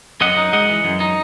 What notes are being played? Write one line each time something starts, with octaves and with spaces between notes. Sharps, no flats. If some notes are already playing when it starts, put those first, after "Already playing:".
F#2 D#5 F#5
D#4
G#3 D#5 F#5
E3
F#2
D#4